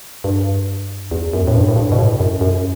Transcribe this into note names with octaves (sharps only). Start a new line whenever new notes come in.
G2
E2
F#2
A2
G2
A2
G2
B2
A2
F#2
F#2